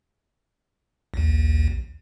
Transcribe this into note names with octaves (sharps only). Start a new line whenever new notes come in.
A#1 D#2